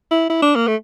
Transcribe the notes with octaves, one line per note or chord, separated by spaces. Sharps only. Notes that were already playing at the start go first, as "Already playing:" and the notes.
E4
E4
D4
A#3
A3